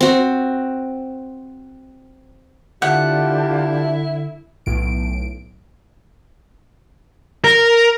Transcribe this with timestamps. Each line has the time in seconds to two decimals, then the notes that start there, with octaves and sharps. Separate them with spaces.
0.01 C4 F#4
2.82 D3 E4 F4 G4 F#5 A5
4.66 B1 A2 D7
7.44 A#4